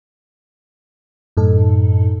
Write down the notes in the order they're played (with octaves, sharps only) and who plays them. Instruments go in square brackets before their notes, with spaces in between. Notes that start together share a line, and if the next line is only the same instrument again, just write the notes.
[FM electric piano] F#2 A2 D#4 A4